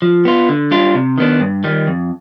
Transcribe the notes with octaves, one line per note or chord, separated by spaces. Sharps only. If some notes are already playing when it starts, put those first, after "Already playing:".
F3
B3 F4
D3
G3 D4 F4
C3
D#3 B3 D4
G2
D#3 G3
F2